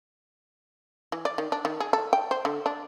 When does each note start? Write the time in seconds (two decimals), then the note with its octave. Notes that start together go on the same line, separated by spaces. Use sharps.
1.12 E3
1.25 D5
1.38 D#3
1.52 D4
1.65 D#3
1.80 G#4
1.93 A4
2.13 G5
2.31 C5
2.45 D3
2.66 D4